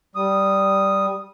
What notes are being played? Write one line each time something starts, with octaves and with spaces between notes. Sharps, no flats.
G3 D#6